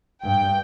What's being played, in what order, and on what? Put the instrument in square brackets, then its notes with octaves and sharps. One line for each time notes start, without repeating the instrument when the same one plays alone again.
[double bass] G2 [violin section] G5